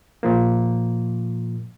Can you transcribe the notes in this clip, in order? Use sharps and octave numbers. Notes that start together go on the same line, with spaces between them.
A#2 F3 A#3